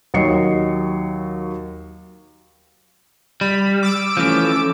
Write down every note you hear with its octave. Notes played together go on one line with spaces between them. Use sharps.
D#2 F#3 D#5 C7 C#7
G3 B5
D6 E6 D7
E3 F3 A3 C#4